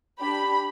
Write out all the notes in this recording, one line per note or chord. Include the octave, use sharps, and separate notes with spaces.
D4 G4 B5